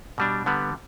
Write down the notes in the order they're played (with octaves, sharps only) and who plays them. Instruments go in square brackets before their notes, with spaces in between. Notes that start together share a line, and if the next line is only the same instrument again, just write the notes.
[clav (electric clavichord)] B2 G3 D4
D3 G3 B3